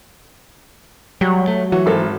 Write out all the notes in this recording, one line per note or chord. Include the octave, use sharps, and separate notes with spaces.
F#3 G3
A3
E3 F#4
G#1 A4 A#4